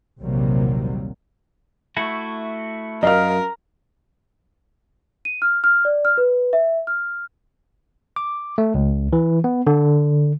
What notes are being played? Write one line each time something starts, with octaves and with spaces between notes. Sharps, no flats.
A#1 D#2 C3 F#3 G3 A#3
A3 E4 F#4
F#2 A#4 D#5 F5 F6
D#7
F6
F6
D5
F6
B4
E5
F6
D6
A3
C#2
E3
B3
D3